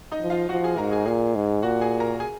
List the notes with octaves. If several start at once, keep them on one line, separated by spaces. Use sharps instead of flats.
D#4 D#5
F3
F4 F5
F3 F#4 F#5
G#4 G#5
G#2 A#4 A#5
G#4 G#5
A#2 G#4 G#5
G#2
A#2 F#4 F#5
G#4 G#5
A#4 A#5
G#4 G#5